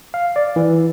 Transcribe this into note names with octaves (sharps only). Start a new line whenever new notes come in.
F5
D5
E3